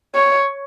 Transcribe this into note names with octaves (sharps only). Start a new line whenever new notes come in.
C#5